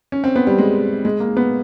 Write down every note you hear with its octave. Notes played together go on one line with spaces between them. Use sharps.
C#4
C4
B3
G3
G#3
G#3
A#3
B3